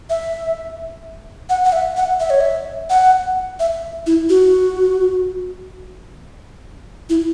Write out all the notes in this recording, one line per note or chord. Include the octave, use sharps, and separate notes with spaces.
E5
F#5
F#5
E5
F#5
E5
C#5
E5
F#5
E5
E4
F#4
E4